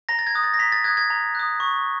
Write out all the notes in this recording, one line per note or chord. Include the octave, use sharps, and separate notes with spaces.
A#5 A#6
A6
G#6
D#6 F#6
A6
A#6
A#5 B6
A6
D#6 F#6 G#6
G#6
A#5
D#6 F#6
C#6